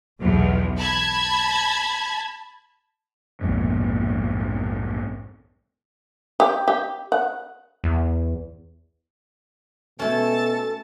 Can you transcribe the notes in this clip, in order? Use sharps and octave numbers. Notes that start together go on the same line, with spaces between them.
B1 E2
A5 B5 G#6
A#1 F2 G#2 B2
G4
G4
F#5
E2
B2 A3 C#4 A4 A5